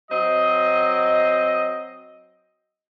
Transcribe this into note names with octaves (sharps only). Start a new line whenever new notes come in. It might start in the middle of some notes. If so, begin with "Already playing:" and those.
F#3 C4 D#5